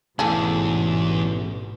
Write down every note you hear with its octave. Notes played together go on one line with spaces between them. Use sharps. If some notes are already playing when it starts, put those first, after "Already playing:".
A1 E2 G#2 B2 G#4 A4